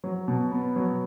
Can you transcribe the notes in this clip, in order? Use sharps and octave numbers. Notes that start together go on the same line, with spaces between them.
F#3
B2
B3
F#3